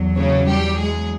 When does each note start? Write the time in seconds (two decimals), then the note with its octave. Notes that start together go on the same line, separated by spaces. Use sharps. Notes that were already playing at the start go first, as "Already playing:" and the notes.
Already playing: E2 F#3
0.16 C#3 C#4
0.47 G3 G4
0.78 G#3 G#4